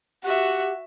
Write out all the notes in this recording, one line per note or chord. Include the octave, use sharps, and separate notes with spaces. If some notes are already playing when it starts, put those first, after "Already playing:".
F#4 G4 E5 F#5